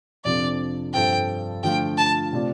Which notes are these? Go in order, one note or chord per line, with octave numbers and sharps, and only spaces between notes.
F2 C3 F3 D4 A4 D5
G2 F3 C4 A4 C5 G5
D3 F3 A3 F4 G5
A5
C3 A3 F4 D5